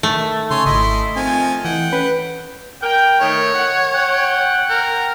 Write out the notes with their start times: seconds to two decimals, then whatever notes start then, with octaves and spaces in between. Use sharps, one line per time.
0.03 D#3 A3
0.51 C#3 C#5 G#5 C6
0.66 G#1 E4 D#5 C6
1.16 D#3 F3 C4 G#5
1.65 E3 F#5 G5
1.93 C#4 B4
2.82 A#4 G5
3.20 D#3 A3 C#5
3.53 F#5
3.93 F#5 G5
4.69 A#4